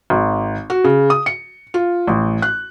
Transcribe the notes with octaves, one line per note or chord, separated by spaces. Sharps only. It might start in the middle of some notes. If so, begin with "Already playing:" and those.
G#1
F#4
C#3
D#6
C#7
F4
A1
F#6